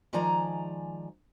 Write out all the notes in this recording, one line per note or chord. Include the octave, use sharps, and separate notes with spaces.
D#3 F3 G#3 D5 G#5 A#5